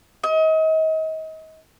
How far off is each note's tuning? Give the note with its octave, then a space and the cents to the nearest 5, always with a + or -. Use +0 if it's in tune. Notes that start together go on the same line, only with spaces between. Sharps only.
D#5 +35